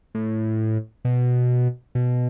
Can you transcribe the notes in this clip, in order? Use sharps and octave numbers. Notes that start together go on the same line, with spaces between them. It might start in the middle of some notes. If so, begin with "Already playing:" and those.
A2
B2
B2